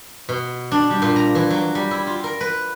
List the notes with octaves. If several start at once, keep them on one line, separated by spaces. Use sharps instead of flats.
B2
D4
G3
A#2
A#5
E3
F#3
G3
E4
F4
A#4
B4